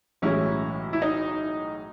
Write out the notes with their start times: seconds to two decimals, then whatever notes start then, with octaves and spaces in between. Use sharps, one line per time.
0.22 B1 A2 E3 G#3 C#4 E4
0.93 E4
1.02 D#4